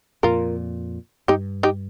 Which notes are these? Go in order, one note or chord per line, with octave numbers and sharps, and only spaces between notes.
F2 A#2 F4 A#4
G2 D#4 G4
D#4 G4